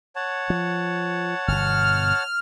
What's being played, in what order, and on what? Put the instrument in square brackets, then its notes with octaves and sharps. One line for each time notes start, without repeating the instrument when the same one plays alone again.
[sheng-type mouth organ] C#5 F#5 A5
[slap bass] F3
[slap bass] G1 B2 [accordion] F6